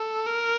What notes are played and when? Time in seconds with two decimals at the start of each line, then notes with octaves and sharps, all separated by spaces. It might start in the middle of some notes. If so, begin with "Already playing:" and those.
Already playing: A4
0.26 A#4